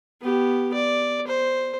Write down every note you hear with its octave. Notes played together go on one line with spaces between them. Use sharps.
B3 G4
D5
C5